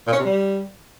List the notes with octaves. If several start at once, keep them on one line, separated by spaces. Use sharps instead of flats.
A#2
C#4
C3
G3